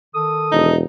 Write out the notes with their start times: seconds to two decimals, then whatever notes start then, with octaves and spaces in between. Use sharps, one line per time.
0.15 D#3 A4 D#6
0.52 E1 D#4